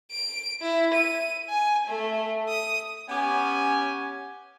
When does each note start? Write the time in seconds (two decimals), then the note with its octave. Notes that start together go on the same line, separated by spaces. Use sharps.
0.12 D7
0.62 E4
0.93 D#7
1.49 G#5
1.87 A3
2.49 D#6
3.09 B3 C#4 G4 C#5 G#5